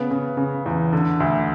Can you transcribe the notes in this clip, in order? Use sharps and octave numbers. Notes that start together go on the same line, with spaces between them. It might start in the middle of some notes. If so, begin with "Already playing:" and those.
Already playing: C#3 B3
C#3
C#3
E2
D3
D2